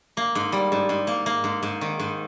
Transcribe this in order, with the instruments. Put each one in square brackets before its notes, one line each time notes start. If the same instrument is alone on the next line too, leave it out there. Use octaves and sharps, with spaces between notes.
[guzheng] A#3
G#2
G3
G#2
G#2
A#3
A#3
G#2
G#2
D#3
G#2